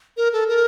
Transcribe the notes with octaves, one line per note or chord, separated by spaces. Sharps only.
A#4
A4
A#4